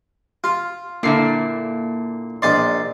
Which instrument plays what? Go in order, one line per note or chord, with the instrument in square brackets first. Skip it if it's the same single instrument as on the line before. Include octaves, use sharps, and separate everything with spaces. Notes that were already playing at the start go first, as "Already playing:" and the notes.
[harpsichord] F4 [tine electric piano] F5
[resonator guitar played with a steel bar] A#2 D3 E4 [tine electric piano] A#3 C7
[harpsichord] A#1 D#4 C6 [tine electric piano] D5 A6